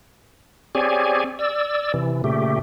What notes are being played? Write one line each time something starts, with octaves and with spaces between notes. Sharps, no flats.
C4 G4 G#4 C#5 D5 G#5
D5 E6
C3 E3
A#2 C#3 A3 G4